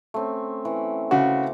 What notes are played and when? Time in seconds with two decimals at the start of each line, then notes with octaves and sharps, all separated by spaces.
0.14 A3 C4 C#4
0.65 E3
1.11 C#3 F#4 D6